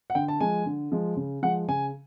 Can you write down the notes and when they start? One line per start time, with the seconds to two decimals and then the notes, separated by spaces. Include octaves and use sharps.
0.10 F#5
0.15 D3 G5
0.28 A5
0.40 F3 G#3 G#5
0.66 D3
0.92 F3 G#3
1.16 C#3
1.43 F3 G#3 F#5
1.68 C#3 G#5